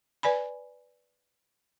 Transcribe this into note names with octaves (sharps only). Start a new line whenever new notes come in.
B4 D5 G#5 B5